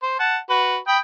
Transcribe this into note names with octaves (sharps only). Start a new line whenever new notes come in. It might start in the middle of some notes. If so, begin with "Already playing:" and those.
C5
F#5 A5
F#4 B4
G5 B5 D#6